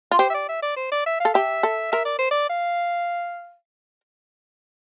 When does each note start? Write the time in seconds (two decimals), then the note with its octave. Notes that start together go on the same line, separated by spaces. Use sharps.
0.11 F4
0.19 G4 C5
0.30 E5
0.34 D5
0.49 E5
0.63 D5
0.76 C5
0.92 D5
1.06 E5
1.20 F5
1.25 A4
1.34 G4 E5
1.63 A4
1.92 A#4 E5
2.05 D5
2.18 C5
2.31 D5
2.50 F5